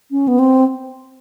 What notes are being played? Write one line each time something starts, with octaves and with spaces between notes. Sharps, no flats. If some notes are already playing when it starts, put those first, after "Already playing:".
C#4
B3
C4